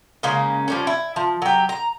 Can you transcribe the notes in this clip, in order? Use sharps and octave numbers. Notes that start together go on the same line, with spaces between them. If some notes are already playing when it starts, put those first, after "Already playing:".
C#3 G#3 A#3 C#4
F3 G3 C#4
E4
F3
F#3 G4
A#5